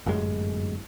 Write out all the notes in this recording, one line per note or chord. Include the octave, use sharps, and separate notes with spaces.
G1 F#2 A2 G#3